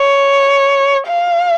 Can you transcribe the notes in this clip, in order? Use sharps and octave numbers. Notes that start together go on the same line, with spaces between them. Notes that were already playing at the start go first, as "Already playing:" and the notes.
Already playing: C#5
F5